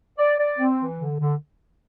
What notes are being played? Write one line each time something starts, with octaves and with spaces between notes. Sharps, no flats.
D5
D5
C4
E3
D3
D3